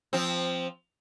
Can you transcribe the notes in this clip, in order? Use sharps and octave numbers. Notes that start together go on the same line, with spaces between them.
F3 C4